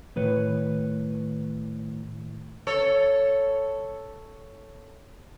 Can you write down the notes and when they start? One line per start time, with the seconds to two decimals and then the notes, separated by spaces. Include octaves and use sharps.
0.16 A2 D#3 B4 C#5
2.67 A4 C#5